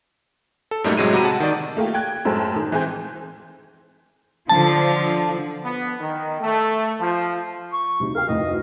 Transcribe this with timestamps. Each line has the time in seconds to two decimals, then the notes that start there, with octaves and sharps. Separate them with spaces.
0.71 A4
0.84 F#2 A2 G3 A3 A#3 D#4
0.97 A2 C3 F#3 G#3 D#7
1.13 C3 F#4 A#5 B5 D#7
1.25 F#5 A5
1.40 D#3 D5
1.77 A3 A#3 F4 G4
1.94 G5 F#6 G#6
2.25 F#2 A2 G#3 A4 C5 A5
2.56 D#3
2.72 E3 G#3 C4 G#5 G6
4.49 D3 F3 A5
5.63 B3
6.00 D#3
6.41 A3
6.99 F3
7.73 C#6
8.00 D2 C3 D#4
8.15 A#4 F5 G5
8.29 F1 D2 A2 D#5